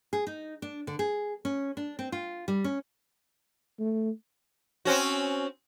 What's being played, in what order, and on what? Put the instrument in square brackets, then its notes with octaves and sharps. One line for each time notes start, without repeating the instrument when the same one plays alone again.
[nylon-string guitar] G#4
D#4
D4
D3
G#4
C#4
D4
C4
F4
G3
C#4
[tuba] A3
[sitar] C4 C#4 F#4